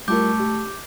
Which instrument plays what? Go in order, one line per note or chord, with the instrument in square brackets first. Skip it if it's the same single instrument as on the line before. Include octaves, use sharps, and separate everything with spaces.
[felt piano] G3 F4 A#4 [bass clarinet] A3 [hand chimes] D6 G6
[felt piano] G4